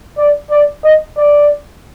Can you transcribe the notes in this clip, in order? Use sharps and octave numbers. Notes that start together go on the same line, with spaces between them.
D5
D5
D#5
D5